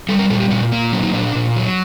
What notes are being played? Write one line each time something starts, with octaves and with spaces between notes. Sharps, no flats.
G3 A4
A#4
A#2 A4
G4
A#2 F#4
A#3
F#3 D4
D#4
A#2 D4
A#2
F#3